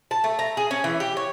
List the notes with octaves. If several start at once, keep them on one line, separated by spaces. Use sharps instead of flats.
A5
A3
A#5
G#4
C#4
E3
G4
C#5